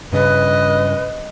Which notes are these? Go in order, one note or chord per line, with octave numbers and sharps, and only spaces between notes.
G2 C#3 B4 D#5